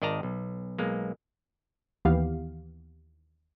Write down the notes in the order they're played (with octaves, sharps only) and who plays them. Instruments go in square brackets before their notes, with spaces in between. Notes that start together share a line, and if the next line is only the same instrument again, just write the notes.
[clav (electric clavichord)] G#1 D#3 D5 D#5 A5 A#5
B1
B1 G#3 A#3
[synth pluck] D#2 E3 B3 G4 F5